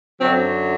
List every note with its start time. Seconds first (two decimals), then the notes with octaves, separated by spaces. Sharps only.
0.20 F#2 D3 F#3 C4